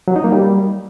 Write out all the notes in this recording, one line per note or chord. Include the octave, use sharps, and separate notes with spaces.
F#3
D#4
A#3
G3